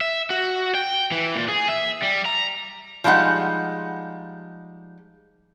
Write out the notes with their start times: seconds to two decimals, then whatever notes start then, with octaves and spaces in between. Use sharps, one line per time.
0.01 E5
0.30 F#4
0.75 G5
1.12 E3
1.35 A#2
1.49 G#4
1.69 E5
2.03 G3
2.26 A#5
3.04 F3 G3 G#3 D#4 F#5